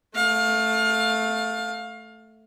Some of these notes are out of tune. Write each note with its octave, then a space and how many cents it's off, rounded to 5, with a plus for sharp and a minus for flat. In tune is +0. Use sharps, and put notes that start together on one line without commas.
A3 +0 F5 +25